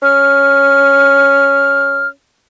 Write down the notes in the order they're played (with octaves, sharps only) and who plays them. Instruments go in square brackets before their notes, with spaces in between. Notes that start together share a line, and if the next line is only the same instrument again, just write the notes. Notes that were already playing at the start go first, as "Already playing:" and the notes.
[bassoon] C#4 [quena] F6